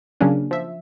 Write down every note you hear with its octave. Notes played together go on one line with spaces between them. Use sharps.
C#3 F#3 A#3 C#4 D4
F3 E5